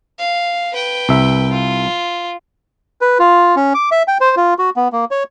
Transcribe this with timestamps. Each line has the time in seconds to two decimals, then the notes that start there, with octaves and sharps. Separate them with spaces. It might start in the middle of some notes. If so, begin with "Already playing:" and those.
0.19 F5
0.73 B4 G5
1.09 C2 E5
1.52 F4
3.01 B4
3.19 F4
3.56 C#4
3.74 D6
3.92 E5
4.08 G5
4.21 C5
4.37 F4
4.59 F#4
4.76 B3
4.93 A#3
5.11 C#5